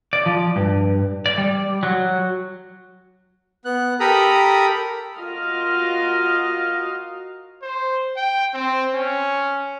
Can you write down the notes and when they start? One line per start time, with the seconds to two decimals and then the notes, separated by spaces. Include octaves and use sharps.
0.13 D5
0.26 F3
0.56 G2
1.26 D5
1.38 G3
1.83 F#3
3.65 B3 F#6
4.00 G4 A4 A#4 A#5 B5 D#6
5.16 F4 F#4 A#4 D#5 F5
7.62 C5
8.16 G5
8.54 C4
8.95 C#4